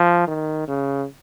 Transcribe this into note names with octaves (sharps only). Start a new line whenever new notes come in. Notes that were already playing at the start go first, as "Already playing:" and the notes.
Already playing: F3
D#3
C#3